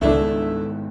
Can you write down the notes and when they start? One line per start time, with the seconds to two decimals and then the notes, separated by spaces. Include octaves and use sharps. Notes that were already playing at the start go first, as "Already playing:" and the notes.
0.02 C#2 G#2 D#3 A3 B3 D4 E4